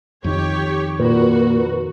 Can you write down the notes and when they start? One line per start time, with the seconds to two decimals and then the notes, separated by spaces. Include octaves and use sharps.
0.24 F2 D#3 G4 C#5
0.99 A#2 F#4 A#4 B4